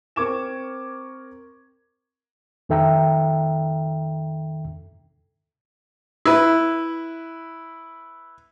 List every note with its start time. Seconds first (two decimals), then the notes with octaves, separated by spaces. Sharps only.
0.16 C4 A#4 C#6 D6 G#6 E7
2.69 F2 D#3 A4 E5 G5 A#5
6.25 E4 B4